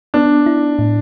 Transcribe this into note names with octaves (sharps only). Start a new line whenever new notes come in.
B3 D4
E4
A2